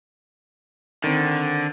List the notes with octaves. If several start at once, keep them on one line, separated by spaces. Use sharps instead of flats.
D3 D#3 C4